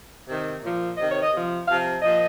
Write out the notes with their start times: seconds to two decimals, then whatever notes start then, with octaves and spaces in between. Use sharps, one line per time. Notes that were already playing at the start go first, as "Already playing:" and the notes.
0.26 C3 D#3
0.61 A#2 F3
0.96 C3 D#3 D#5
1.10 C#5
1.21 D#5
1.31 C3 F3
1.67 C3 F3 F5
2.02 A#2 F3 D#5